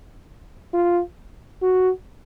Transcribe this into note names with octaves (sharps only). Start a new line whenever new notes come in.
F4
F#4